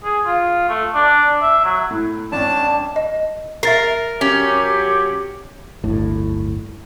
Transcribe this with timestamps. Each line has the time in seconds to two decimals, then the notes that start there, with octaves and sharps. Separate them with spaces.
0.04 G#4
0.26 F4
0.69 A3
0.95 D4
1.42 E5
1.64 F#3
1.91 A2
2.32 G#1 C#4 D4 A5
2.96 D#5
3.63 A#4 E5 A6 C7
4.21 F#3 C#4 G4
5.84 D1 G1 A2